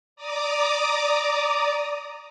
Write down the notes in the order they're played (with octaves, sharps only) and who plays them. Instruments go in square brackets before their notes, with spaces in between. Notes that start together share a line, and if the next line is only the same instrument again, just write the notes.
[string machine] D5 A#5 D6 D#6